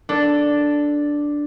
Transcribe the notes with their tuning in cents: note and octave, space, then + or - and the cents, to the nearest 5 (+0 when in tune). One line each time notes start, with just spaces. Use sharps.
D4 +0 A4 +0